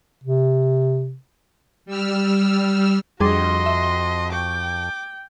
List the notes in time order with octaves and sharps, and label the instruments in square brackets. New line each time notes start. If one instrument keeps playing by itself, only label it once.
[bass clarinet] C3
[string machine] G3 E6 F6
[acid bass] F2 [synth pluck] G3 D4 G#4 [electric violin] F#4 D#5 [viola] C6
[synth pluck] E5
[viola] G5 [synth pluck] C#6 [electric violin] D6